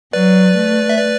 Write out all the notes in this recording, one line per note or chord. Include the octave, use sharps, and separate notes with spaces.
F#3 B4 D5
A3
E5
B4 D5